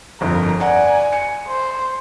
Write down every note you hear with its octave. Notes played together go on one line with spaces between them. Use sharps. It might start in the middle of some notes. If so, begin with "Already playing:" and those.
G1 F2 A#4
D5 F#5 G#5 A#5
C#7
C5